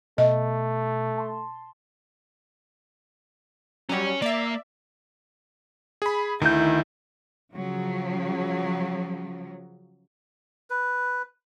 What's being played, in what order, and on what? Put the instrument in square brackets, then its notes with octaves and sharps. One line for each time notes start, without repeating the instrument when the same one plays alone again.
[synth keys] B2 [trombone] A3 [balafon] D#5
[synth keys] A5 C6
[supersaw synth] F#3 G3 [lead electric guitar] C#4 C#5
[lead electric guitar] A#3 [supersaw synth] D5 E5
[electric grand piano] G#4 B5
[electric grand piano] D2 [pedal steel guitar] D#3 G6 [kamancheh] E4
[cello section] C#3 F3 F#3
[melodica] B4